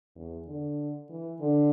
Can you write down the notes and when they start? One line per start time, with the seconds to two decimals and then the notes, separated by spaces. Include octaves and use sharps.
0.16 E2
0.47 D3
1.09 E3
1.41 D3